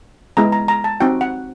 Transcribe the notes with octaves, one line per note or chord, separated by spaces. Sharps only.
G#3 B3 E4 A#5
A#5
A#5
A5
C4 D#4 F#4 G5
F#5